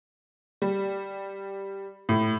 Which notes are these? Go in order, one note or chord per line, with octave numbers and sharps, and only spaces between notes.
G3
A2